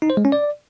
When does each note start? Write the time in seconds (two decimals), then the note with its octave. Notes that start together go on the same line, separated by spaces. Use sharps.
0.02 D#4
0.10 C5
0.17 G#3
0.25 C#4
0.32 D5